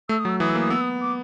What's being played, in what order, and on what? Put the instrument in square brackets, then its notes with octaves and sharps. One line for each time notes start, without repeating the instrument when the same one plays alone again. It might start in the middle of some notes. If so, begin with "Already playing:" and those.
[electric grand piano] A3 [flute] E6
[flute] D#6
[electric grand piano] F#3
[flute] E6
[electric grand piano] E3 [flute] D#6
[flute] E6
[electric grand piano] A#3
[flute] D#6
[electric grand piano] B3 [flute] E6
[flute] D#6
D6